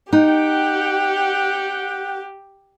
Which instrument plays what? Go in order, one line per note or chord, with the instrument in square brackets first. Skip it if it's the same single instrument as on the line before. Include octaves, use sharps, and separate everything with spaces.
[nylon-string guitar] D#4 [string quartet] G4 [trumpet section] F#5 G5